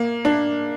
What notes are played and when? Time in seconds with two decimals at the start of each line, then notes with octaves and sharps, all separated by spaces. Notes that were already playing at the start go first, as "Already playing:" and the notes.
Already playing: A#3
0.25 D4